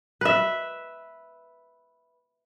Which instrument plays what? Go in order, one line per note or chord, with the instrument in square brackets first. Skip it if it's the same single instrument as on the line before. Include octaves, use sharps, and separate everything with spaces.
[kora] B4 E5